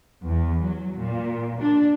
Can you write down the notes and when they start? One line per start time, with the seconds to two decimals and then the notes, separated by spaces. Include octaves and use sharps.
0.25 E2
0.64 F#3
1.01 A#2
1.62 D4